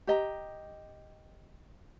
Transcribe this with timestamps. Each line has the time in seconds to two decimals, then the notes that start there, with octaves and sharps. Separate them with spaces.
0.07 G4 D#5 A#5